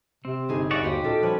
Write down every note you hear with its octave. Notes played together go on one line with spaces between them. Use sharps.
C3 C4
G1 D#4 G#4
G1 F#4 C#5 D5 E5
D#2 F#4 G4 C5 D#5
A#2 G#3 C#4 A4
F3 G3 B4 C#5